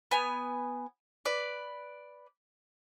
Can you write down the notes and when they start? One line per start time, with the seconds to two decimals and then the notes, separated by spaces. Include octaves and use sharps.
0.11 B3 G#5
1.25 B4 D5